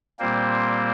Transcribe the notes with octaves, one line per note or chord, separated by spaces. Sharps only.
A#2 G3 A#3 C4 C5